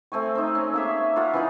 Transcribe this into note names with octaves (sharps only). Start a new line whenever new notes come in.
A3 C4 G#5 C#6
C4 D#4
C#4
A#3 G#4 E5
F4 A#4 D#5 F#5
E3 C#4 D#4 F4